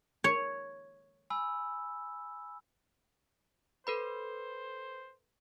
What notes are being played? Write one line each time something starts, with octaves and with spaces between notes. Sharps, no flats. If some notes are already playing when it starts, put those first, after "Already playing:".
C#5
G#5 B5 E6
A4 B4 C5 B5